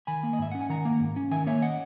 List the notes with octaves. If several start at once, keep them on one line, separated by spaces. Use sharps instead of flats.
D#3 G#5 B5
A#3
D#5
G#2 E5
C#4 F#5
G#5
D#3 F#5 A#5
A#3
G#2
C#4
D#3 E5 G#5
A#3 C#5 E5
D#5 F#5